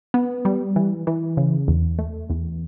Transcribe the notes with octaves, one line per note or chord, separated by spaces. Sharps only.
B3
G3
E3
E3
C#3
E2
A3
E2